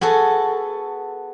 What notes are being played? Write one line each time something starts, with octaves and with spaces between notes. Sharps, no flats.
B3 F#4 G#4 A4